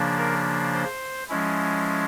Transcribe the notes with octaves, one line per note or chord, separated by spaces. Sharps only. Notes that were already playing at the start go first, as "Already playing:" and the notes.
Already playing: C#3 F3 A#3 D4
A#4
C5
F3 G#3 C#4 E4